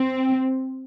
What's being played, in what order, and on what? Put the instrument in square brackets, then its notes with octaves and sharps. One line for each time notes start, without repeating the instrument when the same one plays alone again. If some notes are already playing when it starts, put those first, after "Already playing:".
Already playing: [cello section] C4